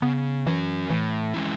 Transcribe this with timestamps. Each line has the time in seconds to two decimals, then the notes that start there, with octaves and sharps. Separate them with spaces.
0.02 C#3 B3
0.46 E3 F#3 C#4
0.90 A2 E3
1.34 G#3 C#4 E4